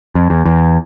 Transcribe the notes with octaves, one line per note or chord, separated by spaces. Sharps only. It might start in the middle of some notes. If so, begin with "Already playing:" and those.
F2
E2
E2